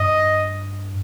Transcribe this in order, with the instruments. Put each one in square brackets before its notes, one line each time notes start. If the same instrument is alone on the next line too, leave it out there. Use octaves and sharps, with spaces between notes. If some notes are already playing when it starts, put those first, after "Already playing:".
Already playing: [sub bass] G2 [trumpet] D#5